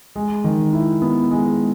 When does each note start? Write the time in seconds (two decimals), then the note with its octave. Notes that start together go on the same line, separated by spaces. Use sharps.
0.16 G#3
0.44 D#3
0.73 E4
1.02 B3
1.31 G#3